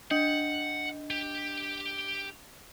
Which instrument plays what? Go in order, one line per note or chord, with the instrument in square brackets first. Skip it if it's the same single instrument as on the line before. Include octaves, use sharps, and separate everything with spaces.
[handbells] D4 D#5 G6 [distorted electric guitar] F#5
[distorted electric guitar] G4